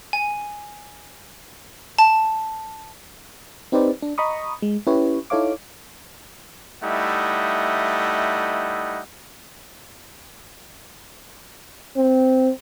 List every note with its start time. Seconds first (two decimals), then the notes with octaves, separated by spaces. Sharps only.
0.13 G#5
1.98 A5
3.72 C4 D#4 G4 B4 C5 D5
4.02 D4
4.18 D#5 A#5 B5 C#6 D#6
4.62 G#3
4.87 C#4 E4 G4 B4 C#5
5.30 D#4 E4 A4 C#5 F5 D6
6.83 G3 A3 D#4 E4 D#5 F#5
11.97 C4